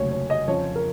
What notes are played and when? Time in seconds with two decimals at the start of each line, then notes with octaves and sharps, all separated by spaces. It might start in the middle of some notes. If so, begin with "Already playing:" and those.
Already playing: F1 D#2 C#3 F#3 C#5
0.11 C#5
0.30 D#5
0.48 F2 C#3 F3 C#5
0.76 A#4